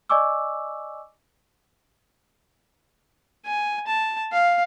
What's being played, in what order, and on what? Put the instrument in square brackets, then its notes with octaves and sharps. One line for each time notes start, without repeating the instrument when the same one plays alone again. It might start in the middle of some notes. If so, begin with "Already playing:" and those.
[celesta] D5 D#5 G#5 C#6 D6 E6
[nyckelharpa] G#5
A5
F5